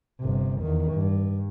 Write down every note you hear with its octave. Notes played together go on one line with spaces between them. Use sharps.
G1 C3
E2 D#3
G2